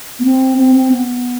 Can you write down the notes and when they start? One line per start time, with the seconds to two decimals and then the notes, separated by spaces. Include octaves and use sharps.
0.19 B3
0.25 C4
0.58 C4
0.76 C4
0.92 B3